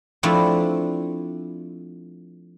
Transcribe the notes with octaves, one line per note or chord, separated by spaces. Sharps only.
F3 A3 C4 D4 E4